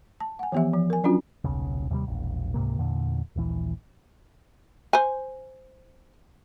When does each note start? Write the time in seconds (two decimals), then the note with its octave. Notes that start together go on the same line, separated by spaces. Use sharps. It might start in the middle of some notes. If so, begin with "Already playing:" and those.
0.20 A5
0.39 F#5 G#5
0.52 E3 F3 B3 G4 E5
0.74 F3
0.90 A#4 G#5
1.04 F#3 C#4 D4 F4 F#4
1.44 D#1 B1 C#3
1.91 D#2 C3 E3 G3
2.07 E1 A#1
2.54 C#2 G#2 C3 A#3
2.78 E2 A#2 D3
3.36 D#1 A#1 E3
4.93 C5 G#5